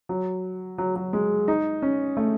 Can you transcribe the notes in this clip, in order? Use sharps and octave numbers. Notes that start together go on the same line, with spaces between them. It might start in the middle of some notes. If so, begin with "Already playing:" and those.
F#3
F#3
F#3
G#3
D#4
C#4
A3